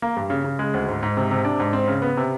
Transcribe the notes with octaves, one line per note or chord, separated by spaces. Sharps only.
A#3
G2
C#3
C#3
G#3
D2
G#2
G#2
C3
C3
D4
G#2
C4
C#3
B3
C3